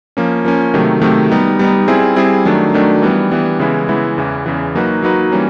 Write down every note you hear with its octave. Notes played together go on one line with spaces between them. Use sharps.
F3 A#3 C#4
F3 A#3 C#4
C3 D#3 F#3 A3
C3 D#3 F#3 A3
G3 B3 D#4
G3 B3 D#4
G3 C4 E4 G#4
G3 C4 E4 G#4
D#3 F#3 A3 D4
D#3 F#3 A3 D4
E3 G3 B3
E3 G3 B3
C#3 E3 G#3 B3 E4
C#3 E3 G#3 B3 E4
E2 C#3 E3
E2 C#3 E3
F#3 A#3 D#4 F#4 B4
F#3 A#3 D#4 F#4 B4
E3 G3 A#3 C#4